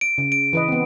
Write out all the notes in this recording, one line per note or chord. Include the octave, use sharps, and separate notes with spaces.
D7
C#3
D7
E3 B4 D#5
B3 C4